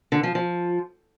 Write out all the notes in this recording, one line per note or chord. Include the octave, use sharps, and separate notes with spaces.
D3
F3
F3